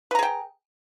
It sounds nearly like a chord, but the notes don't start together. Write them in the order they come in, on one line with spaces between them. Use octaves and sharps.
B4 A#5 G#4 G5